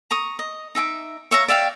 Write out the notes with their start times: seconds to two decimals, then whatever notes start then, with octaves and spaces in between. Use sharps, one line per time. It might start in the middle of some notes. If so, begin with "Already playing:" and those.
0.11 A#5 C#6 D#6
0.39 D#5
0.75 D#4 E5 G#5 D6
1.31 C#5 E5 F5 A#5
1.48 D5 E5 F5 G5